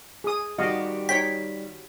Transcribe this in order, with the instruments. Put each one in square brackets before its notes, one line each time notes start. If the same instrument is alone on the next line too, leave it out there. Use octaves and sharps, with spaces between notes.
[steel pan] G#4 D#6
[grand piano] D#3 G3 [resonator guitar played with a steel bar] F#4 G4 [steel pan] D#5 F5
[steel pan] D#4 C#5 G5 [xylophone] B6